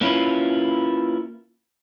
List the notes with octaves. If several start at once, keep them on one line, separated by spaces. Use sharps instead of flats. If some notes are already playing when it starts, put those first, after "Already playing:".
A#3 C#4 E4 F4 B4